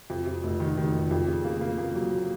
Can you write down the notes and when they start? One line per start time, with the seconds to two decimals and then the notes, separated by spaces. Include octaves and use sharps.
0.10 F2
0.27 F2
0.43 F1
0.60 D#3
0.77 D#3
0.94 F1
1.11 F2
1.28 C#3
1.45 A#3
1.61 A#3
1.78 A#3
1.95 F#3